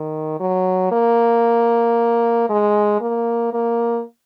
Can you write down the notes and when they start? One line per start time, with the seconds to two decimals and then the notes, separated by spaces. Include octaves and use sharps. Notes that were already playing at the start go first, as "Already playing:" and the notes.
Already playing: D#3
0.40 F#3
0.92 A#3
2.49 G#3
3.01 A#3
3.53 A#3